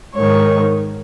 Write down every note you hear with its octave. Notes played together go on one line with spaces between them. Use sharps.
G#2 D#3 C#5